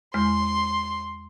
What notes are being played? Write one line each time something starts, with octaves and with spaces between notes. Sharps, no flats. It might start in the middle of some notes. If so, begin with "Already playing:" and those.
E2 G#3 C6 F6